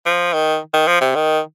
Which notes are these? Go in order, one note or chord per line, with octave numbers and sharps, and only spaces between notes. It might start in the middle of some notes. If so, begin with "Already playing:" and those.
F3
D#3
D#3
F3
C3
D#3